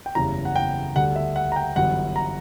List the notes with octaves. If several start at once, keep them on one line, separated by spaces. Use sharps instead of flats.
G5
F#1 E2 C#3 E3 G3 A#5
F#5
G5
D2 D3 G3 F#5
E5
F#5
A#5
G5
G1 F#2 E3 G3 F#5
A#5